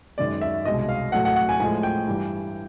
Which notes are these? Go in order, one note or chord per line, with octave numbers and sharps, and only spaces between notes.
F#2 D#3 G#3 D5
E5
C2 B2 G#3 D#5
F5
A2 F#3 A3 F#5
F#5
F#5
G#5
A2 F3 G#3 G#5
G5
G2 E3 G3